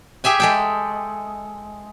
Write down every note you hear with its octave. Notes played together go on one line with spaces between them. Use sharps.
G4 G#4 E5 G#5
G#3 A4 G5